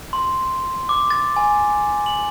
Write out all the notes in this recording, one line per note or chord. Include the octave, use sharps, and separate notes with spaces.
C6
D6
A6
G#5
F#7